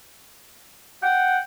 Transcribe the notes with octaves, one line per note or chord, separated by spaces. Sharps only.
F#5 G5